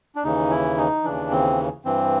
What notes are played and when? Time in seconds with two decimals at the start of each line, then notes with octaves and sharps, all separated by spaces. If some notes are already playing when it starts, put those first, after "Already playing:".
0.15 D4
0.23 D#2 C#3 E3 D#4
0.50 E4
0.78 D#4
1.04 D#2 C#3 E3 D4
1.32 C4
1.85 G2 E3 C4